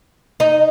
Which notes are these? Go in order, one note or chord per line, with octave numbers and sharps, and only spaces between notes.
D#4